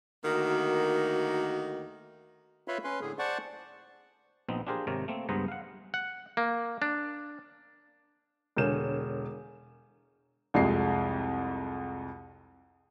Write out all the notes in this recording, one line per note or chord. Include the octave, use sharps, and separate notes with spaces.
D2 D#3 A#3 F#4
F4 B4 C#5 E5 B5 C6
C#4 B4 C6
A2 D3 G#4
C5 D5 F#5 A5 C#6
A#1 B3 C4 D#4
D4 F4 G4 G#4 A#4 C5
G#1 C3 A#4 C#5 D5
A3 A#3 C4
C#2 G2 B3 G#4 C5 A#5
F5 F#5
F#5
A#3
D4
E1 D3 A#4 C#5 G6 E7
C2 F2 G#3 C7